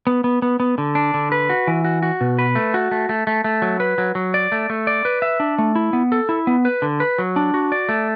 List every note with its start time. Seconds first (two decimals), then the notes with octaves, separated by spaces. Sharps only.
0.07 B3
0.24 B3
0.42 B3
0.60 B3
0.78 D3
0.95 D4
1.14 D3
1.32 B4
1.49 F#4
1.67 E3
1.84 F#4
2.02 F#4
2.21 B2
2.39 B4
2.55 A3
2.74 F#4
2.92 A3
3.09 A3
3.27 A3
3.44 A3
3.62 F#3
3.80 B4
3.98 F#3
4.15 F#3
4.34 D5
4.52 A3
4.70 A3
4.87 D5
5.05 B4
5.22 E5
5.40 D4
5.58 A3
5.75 E4
5.93 B3
6.12 A4
6.29 E4
6.47 B3
6.65 B4
6.82 D3
7.00 B4
7.18 F#3
7.36 D4
7.54 F#4
7.72 D5
7.89 A3